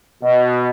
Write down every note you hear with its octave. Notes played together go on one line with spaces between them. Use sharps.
B2